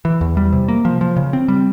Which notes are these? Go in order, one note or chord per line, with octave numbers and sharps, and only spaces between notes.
E3
E2
G3
C3
A#3
F3
F3
C#3
C4
G3